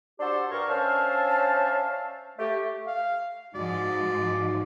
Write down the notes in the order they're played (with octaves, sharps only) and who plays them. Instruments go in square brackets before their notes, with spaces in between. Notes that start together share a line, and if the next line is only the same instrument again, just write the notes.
[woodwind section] D4 F#4 G4 A4 C5 D5
G2 A#4 C#6
C#4 D4 C5 E5 F5 A5
A3 G4
[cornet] F5
[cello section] G#2 F3 [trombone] D#4 [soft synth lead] F#4 [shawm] D5